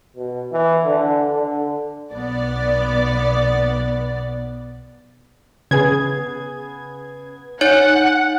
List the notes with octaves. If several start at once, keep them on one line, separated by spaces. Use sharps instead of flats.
B2
E3
D3
D3
B1 B3 D5
C#3 B3 G#4 G#6
D#4 C#5 F#5 G6